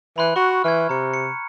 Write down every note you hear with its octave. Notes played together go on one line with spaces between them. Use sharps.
E3 B5 C6 F#6
F#4 C#6
E3 F6 G#6
C3 A#5 C#7
C#7